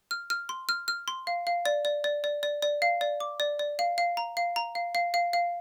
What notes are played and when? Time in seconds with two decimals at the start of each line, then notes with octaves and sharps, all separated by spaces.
0.11 F6
0.30 F6
0.49 C6
0.69 F6
0.88 F6
1.08 C6
1.27 F5
1.47 F5
1.66 D5
1.85 D5
2.04 D5
2.24 D5
2.43 D5
2.62 D5
2.82 F5
3.01 D5
3.20 D6
3.40 D5
3.59 D5
3.79 F5
3.98 F5
4.17 A#5
4.37 F5
4.56 A#5
4.75 F5
4.95 F5
5.14 F5
5.33 F5